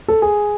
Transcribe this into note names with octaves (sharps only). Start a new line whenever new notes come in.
A4
G#4